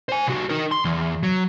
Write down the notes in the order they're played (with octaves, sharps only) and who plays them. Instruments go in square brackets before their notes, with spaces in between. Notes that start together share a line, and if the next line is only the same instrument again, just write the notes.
[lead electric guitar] C5 G#5
C2 F#4
D#4 A#4
C6
E2
F#3